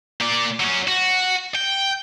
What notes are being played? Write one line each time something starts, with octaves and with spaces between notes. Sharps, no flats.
A#3 D5
F#3 C#4
F#4
G5